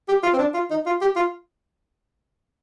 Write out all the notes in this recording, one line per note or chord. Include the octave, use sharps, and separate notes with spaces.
G4
F4
C4
D4
F4
D#4
F4
G4
F4